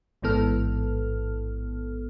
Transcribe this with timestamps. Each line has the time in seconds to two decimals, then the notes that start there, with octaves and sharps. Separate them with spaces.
0.22 A1 G#2 E3 B3 A4 F6